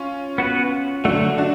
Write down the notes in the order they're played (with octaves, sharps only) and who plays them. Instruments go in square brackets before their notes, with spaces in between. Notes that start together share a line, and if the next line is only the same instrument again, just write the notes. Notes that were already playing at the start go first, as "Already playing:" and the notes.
Already playing: [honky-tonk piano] C#4 F4
[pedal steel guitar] B3 F#4 B4
[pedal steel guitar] D3 F#3 A3 [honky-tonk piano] D4 F#4
[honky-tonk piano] D4 F#4